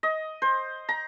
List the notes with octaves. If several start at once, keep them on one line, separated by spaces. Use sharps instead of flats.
D#5
C5
A#5